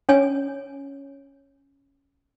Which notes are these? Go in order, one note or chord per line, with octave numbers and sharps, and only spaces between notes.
C#4 C#5 G#5